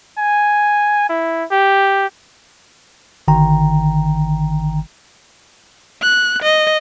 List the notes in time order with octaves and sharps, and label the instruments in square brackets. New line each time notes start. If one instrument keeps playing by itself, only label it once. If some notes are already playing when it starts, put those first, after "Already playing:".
[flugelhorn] G#5
E4
G4
[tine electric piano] G#1 D3 D#3 G5 A#5
[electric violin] F#6
D#5